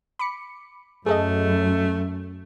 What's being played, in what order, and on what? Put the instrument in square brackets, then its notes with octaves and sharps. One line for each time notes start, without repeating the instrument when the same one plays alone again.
[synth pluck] B5 D6 C#7
[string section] F#2 [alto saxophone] A3 [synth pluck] G#4 A4 D#5